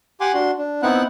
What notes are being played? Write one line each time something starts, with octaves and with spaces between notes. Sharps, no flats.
G4 F#5 G#5 C6 D6
D4 F#4 C6
D4
B3 C4 D#4 E4 F#5 F#6